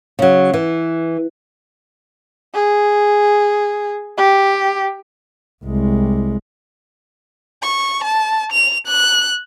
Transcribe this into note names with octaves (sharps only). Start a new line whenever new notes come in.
C#3 F#3
E3
G#4
G4
C2 G#3
C#6
A5
F7
F#6